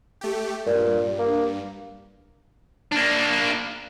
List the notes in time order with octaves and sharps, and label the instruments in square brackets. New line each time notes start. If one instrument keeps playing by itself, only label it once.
[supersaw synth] A3 G4
[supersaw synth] G2 [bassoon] A#2
[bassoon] A#3
[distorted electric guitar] A#3 D4